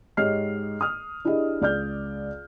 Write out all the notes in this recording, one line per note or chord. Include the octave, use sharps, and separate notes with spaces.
G#2 G4 C#5 D#5 F6 C7
D#6 F6
D4 E4 G4 G#4 D#5
C#2 D5 F6 G6